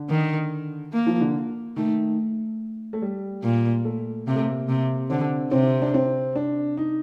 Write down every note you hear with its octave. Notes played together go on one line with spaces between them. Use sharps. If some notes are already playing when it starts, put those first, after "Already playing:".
Already playing: D3
D#3
A#3
F3
D3
D#3 A3
A3
G3
A#2
A3
C3 A#3
A3
A#3
C3
D3 C4
C3 C4
D4
C4
D4
D#4